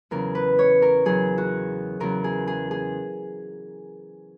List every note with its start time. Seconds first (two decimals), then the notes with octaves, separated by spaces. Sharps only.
0.11 E2 C#3 F#3 A#4
0.35 B4
0.59 C#5
0.82 A#4
1.05 E2 C#3 F#3 G#4
1.38 F#4
2.00 E2 C#3 F#3 A#4
2.24 G#4
2.47 G#4
2.71 G#4